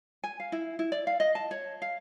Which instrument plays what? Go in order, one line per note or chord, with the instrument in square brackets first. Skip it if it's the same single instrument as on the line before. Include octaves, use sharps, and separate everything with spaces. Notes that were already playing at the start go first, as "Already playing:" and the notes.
[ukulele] G#5
F5
E4
E4
D5
F5
D#5
A5
C#5
F5